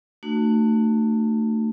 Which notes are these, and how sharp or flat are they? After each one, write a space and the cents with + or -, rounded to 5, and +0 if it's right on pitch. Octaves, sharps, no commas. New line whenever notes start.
A3 +25 D4 +40 F#4 +0